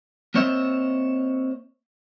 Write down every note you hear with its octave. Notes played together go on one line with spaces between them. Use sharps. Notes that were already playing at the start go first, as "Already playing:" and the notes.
A#3 C4 C5 C#5 D#5 E5